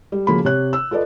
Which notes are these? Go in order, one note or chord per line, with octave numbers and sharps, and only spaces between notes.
G3
C#3 F3 A#3 F#4 B5
C3 C#5 F#6
E6
F4 A4 B4 D5 D#5